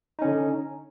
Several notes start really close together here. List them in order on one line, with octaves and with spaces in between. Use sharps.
D#4 C#4 D3